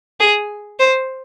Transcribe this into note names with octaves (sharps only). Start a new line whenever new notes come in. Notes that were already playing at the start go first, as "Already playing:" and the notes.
G#4
C5